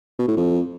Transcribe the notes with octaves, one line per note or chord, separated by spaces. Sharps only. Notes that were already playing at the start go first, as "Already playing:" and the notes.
B2
A2
F2